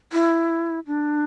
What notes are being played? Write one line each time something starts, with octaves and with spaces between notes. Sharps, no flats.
E4
D4